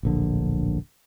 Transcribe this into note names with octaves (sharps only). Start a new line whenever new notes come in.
D1 A#1 D3